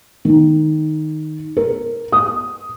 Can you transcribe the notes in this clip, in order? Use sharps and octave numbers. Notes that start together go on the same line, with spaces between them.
D#3
A#4
D#6